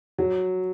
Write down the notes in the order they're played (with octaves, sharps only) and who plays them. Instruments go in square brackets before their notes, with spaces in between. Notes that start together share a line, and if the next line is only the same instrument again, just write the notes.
[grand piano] F#3